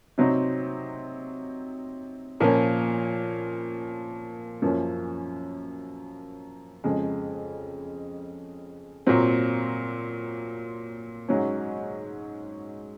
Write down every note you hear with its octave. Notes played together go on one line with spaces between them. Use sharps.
C3 F#3 C4 D#4
A#2 F3 A#3 C#4
F#2 F3 A#3 C#4
F2 C#3 G#3
A#2 F#3 C4
G#2 F#3 C#4